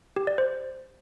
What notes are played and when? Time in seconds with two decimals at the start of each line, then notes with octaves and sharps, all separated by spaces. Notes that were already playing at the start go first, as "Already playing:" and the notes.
0.16 G4
0.27 D5
0.38 C5